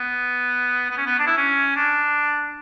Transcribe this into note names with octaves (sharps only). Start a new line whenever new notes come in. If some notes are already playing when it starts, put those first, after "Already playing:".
Already playing: B3
B3
C#4
B3
D4
E4
C#4
D4